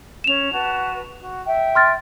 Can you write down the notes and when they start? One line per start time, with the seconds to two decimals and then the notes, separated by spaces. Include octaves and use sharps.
0.24 C#4 E7 F7
0.52 F#4 B4 A5
1.21 F#4
1.45 E5 G5
1.75 C6 F6 A6